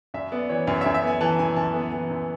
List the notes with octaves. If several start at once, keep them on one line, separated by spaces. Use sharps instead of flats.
F#2 E5
B3 D5
E3 C#5
F#2 C#5
E5
F#2
E5
B3 G#5
E3 A5
F#2 G#5
F#2 A5
B3
E3
F#2